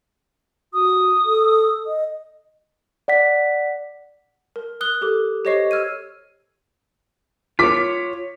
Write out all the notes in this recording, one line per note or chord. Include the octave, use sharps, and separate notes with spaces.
F#4 D#6
A4
D#5
D5 F#5 B6
A#4
A#4 D#6 F#6 G7
G4 A4 D6
G4 C5 C#5 D#5 C#6 C7
E6 F6 G#6 D#7
F4 C#5 D6 B6